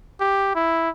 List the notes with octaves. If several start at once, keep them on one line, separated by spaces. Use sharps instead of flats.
G4
E4